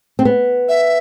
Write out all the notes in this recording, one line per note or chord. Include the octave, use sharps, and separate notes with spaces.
C4
B3
E5